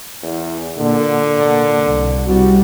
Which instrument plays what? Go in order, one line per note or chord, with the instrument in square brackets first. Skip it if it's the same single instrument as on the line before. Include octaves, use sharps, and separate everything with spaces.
[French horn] E2
[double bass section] A#2 [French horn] D3
[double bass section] A#2
C2
[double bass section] C2 G3 [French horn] F#4